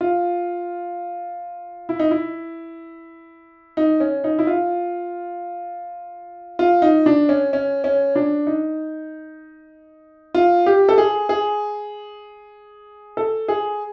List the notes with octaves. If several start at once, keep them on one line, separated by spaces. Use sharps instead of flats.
F4
E4
D#4
E4
D#4
C#4
D#4
E4
F4
F4
D#4
D4
C#4
C#4
C#4
D4
D#4
F4
G4
A4
G#4
G#4
A4
G#4